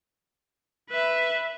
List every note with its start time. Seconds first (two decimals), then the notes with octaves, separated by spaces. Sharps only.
0.90 B4 E5